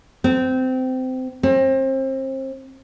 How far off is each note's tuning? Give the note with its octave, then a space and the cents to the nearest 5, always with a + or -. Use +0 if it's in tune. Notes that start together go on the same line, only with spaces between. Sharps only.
C4 -20
C4 +30